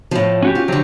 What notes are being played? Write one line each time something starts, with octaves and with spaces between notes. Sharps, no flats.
A2 F3
C#4 F#4 G4
F4
D3 F3 F#3 G4